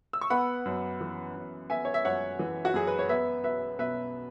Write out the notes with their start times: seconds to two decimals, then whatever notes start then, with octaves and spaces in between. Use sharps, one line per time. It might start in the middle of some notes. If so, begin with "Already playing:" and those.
0.13 E6
0.21 C#6
0.30 B3 F#5 B5
0.65 F#2
1.01 E3
1.36 F#2
1.70 B3 E5 G#5
1.85 C#5
1.94 E5
2.04 F#2 C#5 F#5
2.39 E3
2.65 F#4
2.74 F#2 G#4
2.87 B4
2.99 C#5
3.09 B3 B4 E5
3.44 B1 B4 E5
3.79 B2 B4 E5